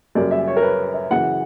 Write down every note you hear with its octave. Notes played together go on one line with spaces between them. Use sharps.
F#2 C#3 G3 A#3 D5
E5
C#5
A#4
B4
E5
F#2 C#3 E3 F#5